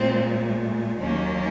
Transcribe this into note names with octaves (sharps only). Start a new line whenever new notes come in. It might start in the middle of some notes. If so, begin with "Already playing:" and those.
Already playing: A#2 G#3 C4
D#2 D#3 F#3 A#3 C#4